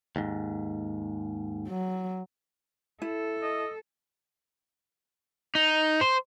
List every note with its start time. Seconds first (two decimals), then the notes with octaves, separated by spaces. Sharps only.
0.16 D#2 G#2
1.68 F#3
3.02 E4 A4
3.43 D#5
5.55 D#4
6.01 C5